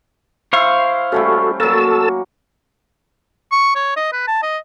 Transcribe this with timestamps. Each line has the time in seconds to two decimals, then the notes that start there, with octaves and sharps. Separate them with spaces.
0.53 E4 C5 F5 C#6
1.12 G3 A3 C#4 F#4 A4
1.60 F#3 A#3 A4 A5 E6
3.52 C#6
3.75 C#5
3.96 D#5
4.12 B4
4.27 A5
4.42 D#5